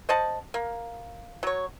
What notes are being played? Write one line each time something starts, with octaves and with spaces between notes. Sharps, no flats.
C5 D#5 F#5 A5
A#3
F#3 C#5